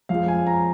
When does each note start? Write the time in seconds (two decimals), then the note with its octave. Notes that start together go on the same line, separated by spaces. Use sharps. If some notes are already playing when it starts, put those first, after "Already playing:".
0.09 F2 F3 G#3 F5
0.28 G#5
0.47 A#5